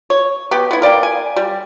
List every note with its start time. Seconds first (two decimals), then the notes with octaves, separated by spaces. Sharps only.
0.10 C#5
0.51 B3 G4
0.71 B3 E4
0.82 A#4 D5 F5 G5
1.03 G#5
1.36 G3